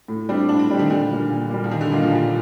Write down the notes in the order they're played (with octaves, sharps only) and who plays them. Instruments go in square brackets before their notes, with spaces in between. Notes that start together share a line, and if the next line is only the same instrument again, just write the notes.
[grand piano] A2
[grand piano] G3 D4 G4 [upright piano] C4
[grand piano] A2 [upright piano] D4
[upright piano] C4
[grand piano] G3 D4 G4
[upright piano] D#3
[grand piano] A#2 [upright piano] D3
[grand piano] G3 A#3
A#2
G3 A#3
[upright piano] F3
[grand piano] A#2 [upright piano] D#3
[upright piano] D3
[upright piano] D#3 [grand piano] G3 A#3 F4
[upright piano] F3
[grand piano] A#2 [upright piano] G3